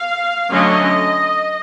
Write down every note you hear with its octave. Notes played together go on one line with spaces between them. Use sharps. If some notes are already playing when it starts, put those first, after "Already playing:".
Already playing: F5
D3 F#3 A3 C#4 D#5